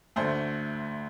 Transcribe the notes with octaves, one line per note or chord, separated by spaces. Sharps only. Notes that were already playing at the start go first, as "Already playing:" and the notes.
D2 D3 A3 C5